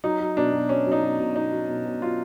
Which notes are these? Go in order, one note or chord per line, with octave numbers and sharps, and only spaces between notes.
F#3 D#4
F#3
B2 D4
B2
B2 C#4
F#3
D#4
B2
B2
B2 D#4
F#3
B2
B2
F#3 F4